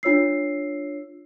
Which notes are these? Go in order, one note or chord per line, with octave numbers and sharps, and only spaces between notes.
D4 F4 C#5 E6 C7